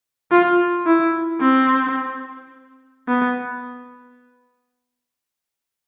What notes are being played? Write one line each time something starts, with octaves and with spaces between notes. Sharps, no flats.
F4
E4
C4
B3